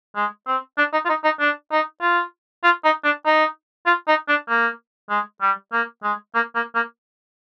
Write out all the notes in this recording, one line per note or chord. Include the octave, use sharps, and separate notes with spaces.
G#3
C4
D4
D#4
F4
D#4
D#4
D4
D#4
F4
F4
D#4
D4
D#4
F4
D#4
D4
A#3
G#3
G3
A#3
G#3
A#3
A#3
A#3